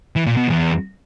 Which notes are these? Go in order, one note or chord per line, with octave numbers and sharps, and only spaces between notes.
E3
A#2
B2
E2